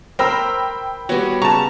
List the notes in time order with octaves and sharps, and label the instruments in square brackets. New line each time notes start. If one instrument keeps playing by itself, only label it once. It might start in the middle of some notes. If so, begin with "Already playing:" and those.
[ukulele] A#4 C5 [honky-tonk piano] G5 B5 E6
[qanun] G3 B3 [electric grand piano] F#4 C#5
[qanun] C#3 [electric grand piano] A5 C#6 [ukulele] A#5